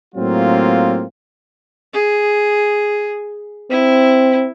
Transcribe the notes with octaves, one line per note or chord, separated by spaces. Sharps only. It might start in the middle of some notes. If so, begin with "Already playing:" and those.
A2 F#3 A#3 C4 F4
G#4
C4 E4